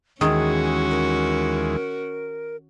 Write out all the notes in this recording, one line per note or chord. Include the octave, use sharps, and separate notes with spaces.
D#2 D#3 E3 G#3 C#4 F#4 G#4
A#4